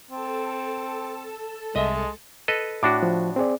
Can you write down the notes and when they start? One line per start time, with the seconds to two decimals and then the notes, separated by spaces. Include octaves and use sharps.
0.11 C4 A4 A5
1.76 C2 G#3 D#5 E5
2.48 A4 B4 D#5
2.83 A2 D4 F#4 D6
3.03 F3
3.36 C4 G#4 D5